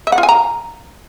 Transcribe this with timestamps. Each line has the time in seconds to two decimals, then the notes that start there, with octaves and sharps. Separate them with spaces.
0.07 E5
0.12 F#5
0.18 F4
0.23 G#5
0.29 A#5